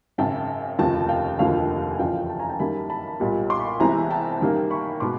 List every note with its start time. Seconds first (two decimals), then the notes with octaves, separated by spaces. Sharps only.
0.18 G#1 F#2 C#3 G5 A5
0.79 F1 D#2 C#3 F3 G5 A5
1.09 F5 G5
1.39 F1 D#2 D3 F3 A#3 F5 G5
1.91 G#5
1.99 F#1 E2 C#3 F3 F5 G5
2.29 G5 A5
2.39 G#5 A#5
2.49 G5 A5
2.60 F#2 D#3 G3 A#3 A5 B5
2.90 A5 B5
3.20 B1 A#2 G3 B3
3.50 C6 D6
3.60 B5 C#6
3.80 C2 C3 E3 G#3 B3 G#5 A#5
4.10 G5 A5
4.40 F#2 D#3 G3 A#3
4.71 B5 C#6
5.00 B2 G#3 B3 C6 D6